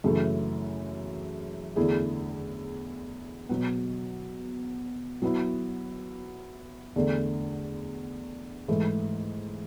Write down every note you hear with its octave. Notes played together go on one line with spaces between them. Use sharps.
F#2 C#3 E3 A3
E2 D3 A3 E4 G#4
B2 F#3 B3
F#3 B3 E4
E2 D3 A3
G#2 E3 A3